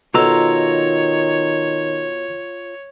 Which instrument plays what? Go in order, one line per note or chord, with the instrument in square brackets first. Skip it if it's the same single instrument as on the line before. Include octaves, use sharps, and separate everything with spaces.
[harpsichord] B2 A4 [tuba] D#3 [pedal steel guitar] F4 A#5 E6 [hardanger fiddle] C#5